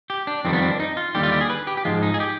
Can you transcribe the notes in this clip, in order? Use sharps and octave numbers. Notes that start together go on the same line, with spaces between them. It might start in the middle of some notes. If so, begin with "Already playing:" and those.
G4
D4
F2 D#3 G3 C4
B3
C4
D4
D#4
F4
D#2 D3 G3 G4
F4
G4
G#4
B4
G4
G4
G#2 F3 G#3 F4
D#4
G#4
G4